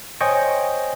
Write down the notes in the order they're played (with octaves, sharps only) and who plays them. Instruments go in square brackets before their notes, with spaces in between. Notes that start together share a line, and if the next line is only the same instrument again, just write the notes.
[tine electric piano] C5 C#5 D#5 G5 G#5 C#6